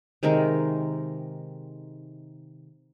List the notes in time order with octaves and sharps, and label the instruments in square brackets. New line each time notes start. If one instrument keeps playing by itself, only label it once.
[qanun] C3 D#3 G#3 A#4